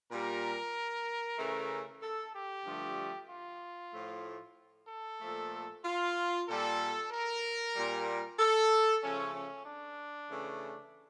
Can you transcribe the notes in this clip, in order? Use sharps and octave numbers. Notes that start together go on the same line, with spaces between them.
A#2 G3 A#4
C#3 E3 A3
A4
G4
G2 D3 F3 A3
F4
A2 F3 A3
A4
A#2 F3 A3
F4
A#2 G3 A4
A#4
A#2 G3
A4
C#3 F3 A3 C#4
C#4
D4
C#3 E3 A3